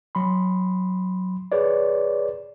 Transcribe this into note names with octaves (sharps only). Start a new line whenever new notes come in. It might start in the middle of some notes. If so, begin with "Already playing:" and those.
F#3 B5 C6
G#4 B4 C#5 D5